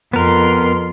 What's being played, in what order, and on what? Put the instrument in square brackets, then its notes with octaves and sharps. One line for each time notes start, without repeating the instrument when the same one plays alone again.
[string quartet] F2 C6 [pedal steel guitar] B3 A#4